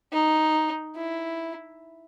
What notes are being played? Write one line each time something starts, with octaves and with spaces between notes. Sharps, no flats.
D#4
E4